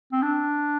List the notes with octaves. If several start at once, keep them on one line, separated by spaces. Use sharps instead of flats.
C4
D4